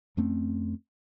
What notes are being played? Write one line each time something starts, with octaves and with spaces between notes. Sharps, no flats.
F2 A3 C4 C#4